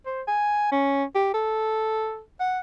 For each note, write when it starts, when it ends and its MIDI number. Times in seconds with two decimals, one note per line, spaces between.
0.06 0.22 72
0.27 0.69 80
0.72 1.04 61
1.15 1.33 67
1.34 2.21 69
2.40 2.60 78